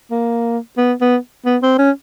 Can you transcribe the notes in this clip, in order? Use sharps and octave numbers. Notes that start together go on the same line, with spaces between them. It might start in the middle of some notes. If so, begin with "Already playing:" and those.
A#3
B3
B3
B3
C4
C#4